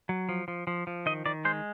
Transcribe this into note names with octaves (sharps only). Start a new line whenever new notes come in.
F#3
F3
F3
F3
F3
D#3 D#5
D#3 D5
G#3 C5